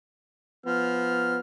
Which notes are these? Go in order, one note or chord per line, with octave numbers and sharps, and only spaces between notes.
F3 B3 F6